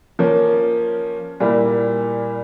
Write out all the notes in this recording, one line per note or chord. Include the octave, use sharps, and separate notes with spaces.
F3 A#3 C#4
A#2 G3 A#3 E4